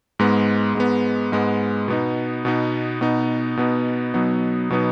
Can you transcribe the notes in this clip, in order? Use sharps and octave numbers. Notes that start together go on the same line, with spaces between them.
G#2 G#3 B3
G#2 G#3 B3
G#2 G#3 B3
B2 B3 D#4
B2 B3 D#4
B2 B3 D#4
B2 B3 D#4
B2 F#3 B3 D#4
B2 F#3 B3 D#4